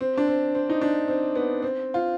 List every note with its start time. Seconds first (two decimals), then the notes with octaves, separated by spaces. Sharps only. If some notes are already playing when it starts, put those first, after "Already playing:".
0.01 C4
0.17 D4
0.28 C4
0.55 C4
0.70 D#4
0.81 D4
1.08 C4
1.35 B3
1.62 C4
1.94 F4